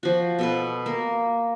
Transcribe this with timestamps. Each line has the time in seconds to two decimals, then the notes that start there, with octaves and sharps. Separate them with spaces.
0.03 F3 F#4
0.39 B2 A4 B4
0.86 A#3